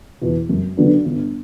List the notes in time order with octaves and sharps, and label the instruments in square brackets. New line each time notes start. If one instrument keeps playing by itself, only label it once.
[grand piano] E2 B2
F#2
D3 F#3 B3 D4
G1